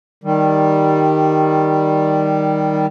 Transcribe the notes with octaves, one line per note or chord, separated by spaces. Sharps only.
D#3 G3